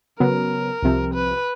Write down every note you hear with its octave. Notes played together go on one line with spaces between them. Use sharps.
C#3 F#3 B3 A#4
C2 C3 F3
B4